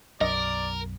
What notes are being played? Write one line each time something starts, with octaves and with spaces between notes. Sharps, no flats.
B1 F#2 F#3 A#4 D5 D#5